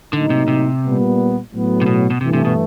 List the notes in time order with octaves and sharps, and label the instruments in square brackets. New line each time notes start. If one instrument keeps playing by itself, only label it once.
[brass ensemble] A2 F#3 A#3 D#4 [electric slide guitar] D3
[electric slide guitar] C3
C3
[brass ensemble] A#2 G3 B3
A2 F#3 B3
[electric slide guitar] C3
B2
B2
[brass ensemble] G2 E3 A3 [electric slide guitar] C3
[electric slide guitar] C3
B2